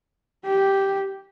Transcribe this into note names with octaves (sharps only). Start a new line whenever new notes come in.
G4